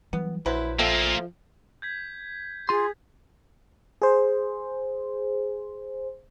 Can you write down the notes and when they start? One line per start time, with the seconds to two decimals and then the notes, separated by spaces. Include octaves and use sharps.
0.13 E3 F#3 G3 B3
0.46 A#1 F#3 E4 B4 C5
0.79 F3 A#3 F4 A4 E5 G5
1.82 G6 G#6 B6
2.69 F4 G#4 C6
4.02 G#4 C5